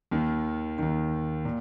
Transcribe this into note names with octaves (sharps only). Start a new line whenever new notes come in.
D#2 D#3
D#2 D#3
A#2